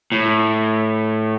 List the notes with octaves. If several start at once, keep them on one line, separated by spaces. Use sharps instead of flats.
A2